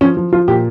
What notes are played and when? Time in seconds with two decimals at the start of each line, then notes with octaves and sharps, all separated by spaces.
0.01 F3 C#4
0.17 F3
0.32 F3 F4
0.48 A#2 G4